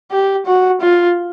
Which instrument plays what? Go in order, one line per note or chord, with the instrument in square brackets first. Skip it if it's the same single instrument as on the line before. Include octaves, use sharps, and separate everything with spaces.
[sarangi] G4
F#4
F4